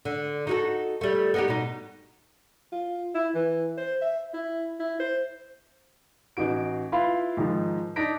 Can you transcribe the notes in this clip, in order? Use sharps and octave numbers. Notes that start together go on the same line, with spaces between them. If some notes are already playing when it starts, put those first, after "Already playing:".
D3
D#4 F#4 A4
G3 A3
B3 D#4 G4
B2 D#4
F4
E4
E3
C5
E5
E4
E4
C5
A1 D#4 F#4 D7
E4 F4 B4 F5 B5 C6
G#2 D#3 F3
D4 D#4 A#6 B6 D7